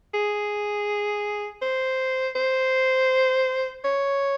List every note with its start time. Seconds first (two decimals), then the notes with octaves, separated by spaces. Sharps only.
0.14 G#4
1.62 C5
2.35 C5
3.84 C#5